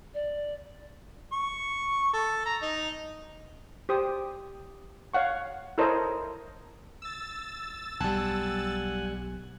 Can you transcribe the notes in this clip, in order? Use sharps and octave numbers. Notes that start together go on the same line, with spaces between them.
D5
C#6
A4
A#5
D#4
G4 C5 D#6
C#5 F5 F#5 C#6
E4 A4 A#4 C5 C#5 D#5
E6 A6
B1 G3 F#5 G#5 A5